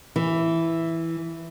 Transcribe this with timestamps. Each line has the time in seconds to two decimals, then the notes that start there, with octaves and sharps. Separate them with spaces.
0.16 E3